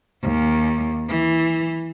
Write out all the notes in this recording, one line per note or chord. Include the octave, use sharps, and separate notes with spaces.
D#2
E3